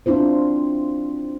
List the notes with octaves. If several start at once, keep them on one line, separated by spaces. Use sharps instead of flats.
C4 D4 E4 F4 C5